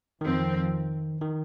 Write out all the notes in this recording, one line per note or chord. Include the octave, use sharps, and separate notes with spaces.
F2 D#3 F3 C4
D#3